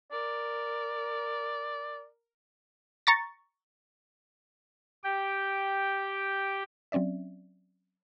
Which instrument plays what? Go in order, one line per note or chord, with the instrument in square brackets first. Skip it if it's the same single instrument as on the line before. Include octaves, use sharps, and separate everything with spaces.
[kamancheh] A#4 [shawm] D5
[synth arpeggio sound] A#5 C#6 A6
[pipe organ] G4 G5
[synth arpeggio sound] F#3 C4 C#4 D5 E5